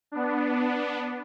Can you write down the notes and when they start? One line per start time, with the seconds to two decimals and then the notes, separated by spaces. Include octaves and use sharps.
0.12 B3 D4